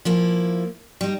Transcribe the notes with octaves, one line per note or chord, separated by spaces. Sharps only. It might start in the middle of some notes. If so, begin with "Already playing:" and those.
F3 A#3 E4
G3 D#4